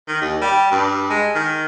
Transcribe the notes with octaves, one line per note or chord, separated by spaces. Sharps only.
D#3
D#2
G3
G2
G#3
D#3